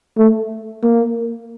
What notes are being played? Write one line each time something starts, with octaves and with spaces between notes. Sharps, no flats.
A3
A#3